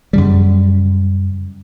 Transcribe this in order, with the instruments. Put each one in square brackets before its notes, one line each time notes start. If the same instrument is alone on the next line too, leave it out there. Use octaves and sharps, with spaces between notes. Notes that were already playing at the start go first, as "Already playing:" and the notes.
[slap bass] F#2 C#3 G3